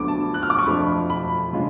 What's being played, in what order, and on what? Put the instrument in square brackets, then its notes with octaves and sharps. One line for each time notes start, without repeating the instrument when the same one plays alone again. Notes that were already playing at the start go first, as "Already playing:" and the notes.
Already playing: [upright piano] D2 D3 F#3 B3 D4 D6
A5
F#6
F6
D6
C#6
F2 F3 A3 D4 B5
B5
C#3 G#3 D4 F4